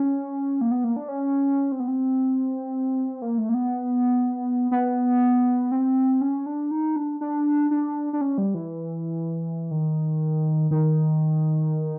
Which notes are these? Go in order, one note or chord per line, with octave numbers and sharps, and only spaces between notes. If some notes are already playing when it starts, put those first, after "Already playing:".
Already playing: C#4
A#3
B3
A#3
D4
C#4
C4
B3
C4
A#3
A3
A#3
B3
B3
C4
C#4
D4
D#4
D4
D4
D4
D4
C#4
G3
E3
D#3
D#3